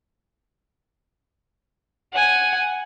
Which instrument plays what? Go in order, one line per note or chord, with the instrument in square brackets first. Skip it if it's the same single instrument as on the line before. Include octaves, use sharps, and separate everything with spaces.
[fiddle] F#5 G#5